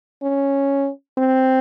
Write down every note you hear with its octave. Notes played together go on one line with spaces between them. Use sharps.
C#4
C4